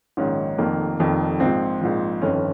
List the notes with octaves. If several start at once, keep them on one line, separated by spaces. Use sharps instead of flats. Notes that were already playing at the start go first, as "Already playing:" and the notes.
A#1 G#2 D#3 C#4
F1 F2 D#3 A#3
F1 F2 D#3
A#1 G#2 F3 C4
A#1 G#2 F3
G1 F2 D#3 C#4